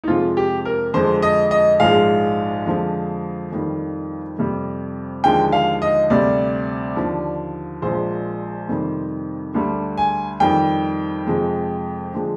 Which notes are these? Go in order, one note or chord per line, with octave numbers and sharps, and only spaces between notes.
D#4
F2 C3 F3 G#3 F4
G4
A#4
F2 D3 F3 G#3 C5
D#5
D#5
A#1 G#2 F3 G#3 F5
F2 D3 F3 G#3
F2 D#3 G3
F2 C3 G3
D#2 D3 F3 G#3 G5
F5
D#5
D2 C3 G3 D5
D#2 D3 F3
A#1 A#2 F3 G#3 C5
F2 C3 D#3 G3
D2 D3 G3
G#5
F2 D#3 G3 G5
F2 C3 F3 G#3
D3 F3 G#3